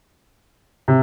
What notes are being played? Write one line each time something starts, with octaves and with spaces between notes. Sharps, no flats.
C3